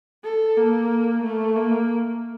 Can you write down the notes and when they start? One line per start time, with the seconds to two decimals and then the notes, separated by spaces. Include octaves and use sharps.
0.24 A4
0.57 A#3
1.23 A3
1.56 A#3